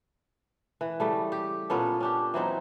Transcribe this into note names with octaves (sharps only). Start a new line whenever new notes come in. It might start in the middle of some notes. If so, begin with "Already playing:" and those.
E3
C#3 G3 A3
G4
A#2 B3 C#4 A4
C#4 D4 G4
E3 F#3 C4 D#4